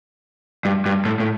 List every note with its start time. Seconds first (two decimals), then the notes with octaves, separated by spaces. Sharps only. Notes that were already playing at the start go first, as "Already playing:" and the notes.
0.65 G2
0.86 G2
1.05 A2
1.20 A2